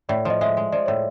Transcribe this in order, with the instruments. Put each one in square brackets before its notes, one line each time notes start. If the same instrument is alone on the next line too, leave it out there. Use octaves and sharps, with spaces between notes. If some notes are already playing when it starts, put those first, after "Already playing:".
[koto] A2 [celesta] D5
[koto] F3 [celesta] D#5
[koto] G#3 [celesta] E5
[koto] G#3
[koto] F3 [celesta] D5
[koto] A2 [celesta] C#5